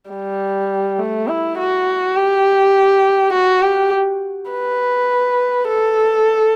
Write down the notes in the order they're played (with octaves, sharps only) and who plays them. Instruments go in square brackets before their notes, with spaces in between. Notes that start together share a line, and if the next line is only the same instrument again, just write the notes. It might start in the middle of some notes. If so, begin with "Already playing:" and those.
[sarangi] G3
A3
E4
F#4
G4
F#4
G4
B4
A4